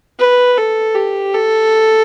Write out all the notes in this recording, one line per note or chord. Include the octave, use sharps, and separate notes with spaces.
B4
A4
G4
A4